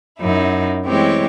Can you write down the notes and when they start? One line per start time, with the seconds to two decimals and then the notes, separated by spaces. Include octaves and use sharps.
0.19 F#2 D#4 E4
0.85 E3 G#3 A3 C4 G4 C#5